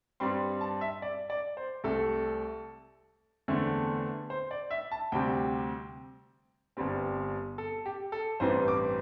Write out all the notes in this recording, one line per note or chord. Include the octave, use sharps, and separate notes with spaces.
G2 G3 C4 C6
A5
E5
D5
D5
C5
C2 C3 A3 A4
E2 D3 A3 C4
C5
D5
E5
A5
D2 C3 G3 C4 G5
G1 G2 G3 C4
A4
G4
A4
A1 G2 E3 C4 C5
D6